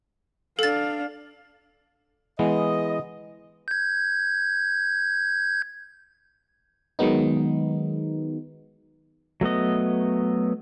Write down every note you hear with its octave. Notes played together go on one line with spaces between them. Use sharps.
D4 A4 F5 A6
E3 G#3 B3 D#5
G6 G#6
D#3 F#3 G#3 B3 D#4
F#3 A3 B3 D#5